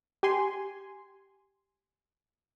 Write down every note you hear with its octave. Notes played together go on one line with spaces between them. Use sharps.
G4 G#5 C6